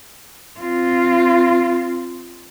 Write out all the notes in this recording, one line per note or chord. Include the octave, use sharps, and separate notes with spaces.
C4 F4